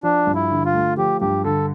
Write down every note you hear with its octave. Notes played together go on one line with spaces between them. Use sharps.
F3 D4
G2
E4
D3
F4
A3
F3 G4
G2 G4
D3 A4